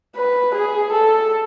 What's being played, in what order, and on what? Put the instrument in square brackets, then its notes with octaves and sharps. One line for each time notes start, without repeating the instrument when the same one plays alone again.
[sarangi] B4
G#4
A4